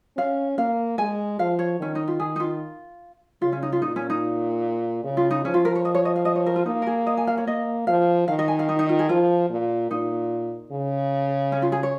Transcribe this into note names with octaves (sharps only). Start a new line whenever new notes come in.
C#4 F5
A#3 F5
G#3 G#5
F3 F5
C#5
D#3 C#4
D#4
F4
D#3 G#4
D#4
F4
C#3 F4
C#4
D#4
F4
A#2 D#4
C#4
D#4
C#3
F4
D#4
F3 C#4
F4
A#4
C#5
D#5
C#5
D#5
F5
D#5
C#5
A#4
F4
A#3 D#4
A#4
G#4
D#5
G#5
F5
C#5
A#3 D#5
F3 F5
D#3 F5
D#5
G#5
F5
D#4
D#4
F4
G#4
F3 F4
A#2
A#2 D#4
C#3
C#4
F4
G#4
C#5